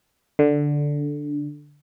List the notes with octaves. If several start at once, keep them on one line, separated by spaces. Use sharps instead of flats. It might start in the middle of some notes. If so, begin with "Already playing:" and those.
D3